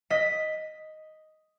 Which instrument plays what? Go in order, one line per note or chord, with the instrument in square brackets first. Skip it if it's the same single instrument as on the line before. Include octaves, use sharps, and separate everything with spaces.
[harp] D#5 B6